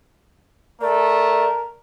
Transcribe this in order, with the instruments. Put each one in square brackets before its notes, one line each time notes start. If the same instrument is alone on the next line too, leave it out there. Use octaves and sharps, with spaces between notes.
[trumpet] A3 [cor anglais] A#4 [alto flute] D5